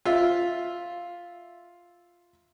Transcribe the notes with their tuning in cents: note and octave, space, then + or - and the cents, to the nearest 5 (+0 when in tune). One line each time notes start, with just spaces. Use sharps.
F4 +0 E5 +0